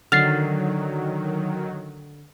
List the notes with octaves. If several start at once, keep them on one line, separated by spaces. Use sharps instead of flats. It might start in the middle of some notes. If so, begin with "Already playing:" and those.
D3 D#3 F#3 F6 A6 C7